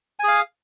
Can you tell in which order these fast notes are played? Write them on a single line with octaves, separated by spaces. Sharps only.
G#5 G#4 F5